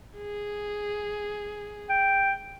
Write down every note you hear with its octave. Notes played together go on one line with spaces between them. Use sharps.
G#4
G5